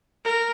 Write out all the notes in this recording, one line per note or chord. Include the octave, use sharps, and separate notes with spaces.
A#4